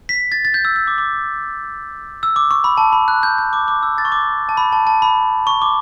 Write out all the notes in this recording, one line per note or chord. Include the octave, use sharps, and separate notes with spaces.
B6
A6
A6
G6
E6
E6
D6
D6
E6
D6
C#6
B5
A5
B5
F#6
G6
G6
D6
D6
E6
A6
C#6
D6
A5
B5
A5
A5
B5
C#6
D6